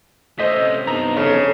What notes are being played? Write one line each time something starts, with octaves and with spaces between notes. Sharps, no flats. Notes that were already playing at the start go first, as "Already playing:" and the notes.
A3 C#4 C5 D#5 B6
C3
G2 B3 D#4 A#5
F2 C#3